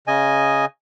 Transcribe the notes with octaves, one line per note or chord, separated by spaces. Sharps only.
C#3 D#5 G#5